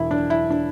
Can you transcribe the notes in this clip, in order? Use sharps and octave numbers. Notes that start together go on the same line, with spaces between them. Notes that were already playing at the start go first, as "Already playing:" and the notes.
Already playing: E1 E4
D4
E4
D4